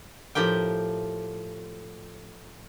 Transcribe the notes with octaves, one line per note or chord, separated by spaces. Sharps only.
A2 F3 G4 A#4 G5